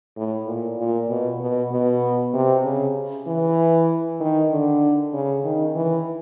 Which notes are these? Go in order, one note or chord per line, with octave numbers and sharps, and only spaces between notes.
A2
A#2
A#2
B2
B2
B2
C3
C#3
E3
D#3
D3
C#3
D#3
E3